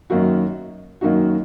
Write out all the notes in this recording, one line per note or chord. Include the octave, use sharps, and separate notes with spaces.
F#2 D#3 A#3 D#4 F#4
F#2 D#3 A#3 D#4 F#4